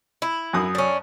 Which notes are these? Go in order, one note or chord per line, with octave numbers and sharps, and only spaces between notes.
E4
F#2 D#6
C#4 D4